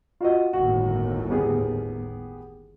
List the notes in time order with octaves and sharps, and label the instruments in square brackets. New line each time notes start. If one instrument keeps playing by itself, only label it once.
[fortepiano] F4 F#4 D#5
[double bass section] G1 D#2 A2 [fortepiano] F#4
[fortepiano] B3 G4 G#4